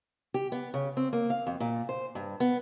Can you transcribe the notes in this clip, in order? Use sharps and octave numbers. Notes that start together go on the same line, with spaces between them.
G4
B3
C#3
C4
A#3
F5
F2
A#2
C5
G2
B3